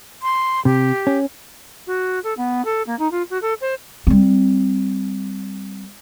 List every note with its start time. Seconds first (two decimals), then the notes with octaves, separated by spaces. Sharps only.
0.22 C6
0.65 C3 G4
1.07 C#4
1.86 F#4
2.23 A4
2.37 B3
2.64 A4
2.86 A#3
2.98 D#4
3.11 F4
3.29 F#4
3.41 A4
3.61 C5
4.07 G3 C4